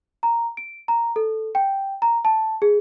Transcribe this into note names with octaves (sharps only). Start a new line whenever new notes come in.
A#5
D7
A#5
A4
G5
A#5
A5
G#4